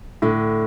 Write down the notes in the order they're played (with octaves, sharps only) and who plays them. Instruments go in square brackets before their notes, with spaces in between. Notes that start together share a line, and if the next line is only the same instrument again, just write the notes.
[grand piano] A2 [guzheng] D3